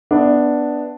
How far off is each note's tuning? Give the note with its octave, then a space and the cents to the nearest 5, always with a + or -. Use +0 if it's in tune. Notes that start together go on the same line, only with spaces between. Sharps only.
B3 +0 D4 +0 E5 -30